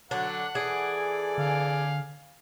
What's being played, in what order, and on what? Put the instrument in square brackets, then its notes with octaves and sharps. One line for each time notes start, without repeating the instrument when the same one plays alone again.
[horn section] D3 F#3 [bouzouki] D4 [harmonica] F#5
[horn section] E3 A4 D5 [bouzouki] G#4
[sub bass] D3 [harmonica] F5 G#5